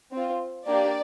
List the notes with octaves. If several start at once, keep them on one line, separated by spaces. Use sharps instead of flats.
C4 F4
A#3 D4 G4 D5